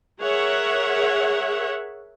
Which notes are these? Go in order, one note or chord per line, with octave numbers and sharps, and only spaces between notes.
G#4 A#4 C#5 E5 F#5